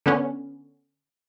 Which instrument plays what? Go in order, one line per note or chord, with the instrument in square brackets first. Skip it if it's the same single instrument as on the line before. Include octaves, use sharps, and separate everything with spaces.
[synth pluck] D3 B3 C#4